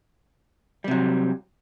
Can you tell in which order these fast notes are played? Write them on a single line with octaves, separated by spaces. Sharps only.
G3 C3 F#3